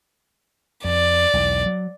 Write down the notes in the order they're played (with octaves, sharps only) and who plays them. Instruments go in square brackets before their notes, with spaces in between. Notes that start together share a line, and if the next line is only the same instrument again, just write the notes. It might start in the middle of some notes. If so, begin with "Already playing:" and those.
[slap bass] F2 [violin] D5
[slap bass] B1 E2
F#3